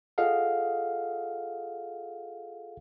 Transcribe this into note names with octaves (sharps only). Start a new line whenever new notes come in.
F4 G#4 A4 D#5 F5 F#5